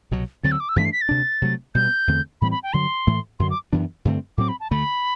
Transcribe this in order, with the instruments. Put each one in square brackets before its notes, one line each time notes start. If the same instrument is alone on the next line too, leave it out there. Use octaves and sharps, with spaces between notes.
[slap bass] C2 B2 F#3
[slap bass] D2 D3 F#3 C4 [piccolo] A6
[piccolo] E6
D6
E6
[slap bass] G2 E3 A3 D4 [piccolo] B6
[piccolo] C7
B6
A6
[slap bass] D2 C3 G3 D4
C3 F#3 A3
[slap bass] B2 G3 B3 [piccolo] G6
[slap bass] E2 D3 A3 C4
[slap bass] A2 E3 G3 C4 [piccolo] B5
[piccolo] B5
G5
[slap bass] G2 D3 F#3 [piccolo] C6
[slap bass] A2 E3 A3
[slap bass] F#2 D3 F#3 [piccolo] C6
[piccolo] D6
[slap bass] F#2 E3 B3 D4
G2 D3 A3 C4
[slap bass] A2 F#3 C4 [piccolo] D6
[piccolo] B5
A5
[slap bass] D2 D3 A3 [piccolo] B5